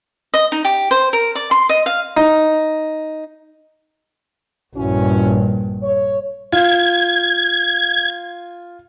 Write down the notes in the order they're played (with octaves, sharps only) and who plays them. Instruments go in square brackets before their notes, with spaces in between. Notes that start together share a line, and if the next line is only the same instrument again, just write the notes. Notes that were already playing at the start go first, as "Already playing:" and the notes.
[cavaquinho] D#5
D#4
G4
C5
A#4
D5
C6
D#5
F5
[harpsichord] D#4
[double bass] A#1 G2 [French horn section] C#4 E4 F#4
[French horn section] C#5
[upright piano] F4 [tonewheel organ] G#6